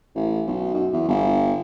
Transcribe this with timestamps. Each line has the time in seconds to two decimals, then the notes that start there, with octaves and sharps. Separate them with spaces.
0.15 A1
0.47 B1
0.74 F#2
0.93 E2
1.08 G1